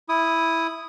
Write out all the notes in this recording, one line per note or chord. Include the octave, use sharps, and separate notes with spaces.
E4 D#6